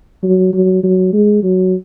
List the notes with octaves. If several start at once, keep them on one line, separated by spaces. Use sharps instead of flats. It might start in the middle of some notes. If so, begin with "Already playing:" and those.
F#3
F#3
F#3
G#3
F#3